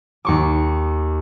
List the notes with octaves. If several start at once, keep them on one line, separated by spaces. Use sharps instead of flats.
D#2 C#6 D6